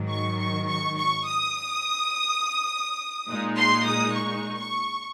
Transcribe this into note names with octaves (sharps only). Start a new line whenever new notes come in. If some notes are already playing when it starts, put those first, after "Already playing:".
Already playing: G#2 D#3 F#3
C#6
C#6
C#6
C#6
D#6
A#2 G#3 D#4
C6
D#6
C#6
C#6